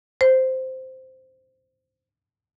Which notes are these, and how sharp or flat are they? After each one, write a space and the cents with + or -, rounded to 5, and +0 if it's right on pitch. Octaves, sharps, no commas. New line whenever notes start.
C5 -5